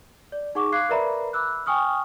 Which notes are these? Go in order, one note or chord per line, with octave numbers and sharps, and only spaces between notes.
D5
D#4 G#4 F#5 C#6 D6
F5 C6 D6 F#6 G#6 C7
A#4 B4 D5 E5 A#5 B5
B5 D6 E6 F#6
G5 G#5 C#6 D#6 F6